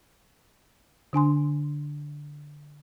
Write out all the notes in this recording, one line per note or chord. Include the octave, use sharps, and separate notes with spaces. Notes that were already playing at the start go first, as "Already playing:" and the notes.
D3 D4 G#5 C6